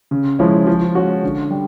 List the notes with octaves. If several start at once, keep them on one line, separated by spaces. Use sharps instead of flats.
C#3
F3 G#3 C#4 E4
F3
G#3 C#4 F#4
D3
G3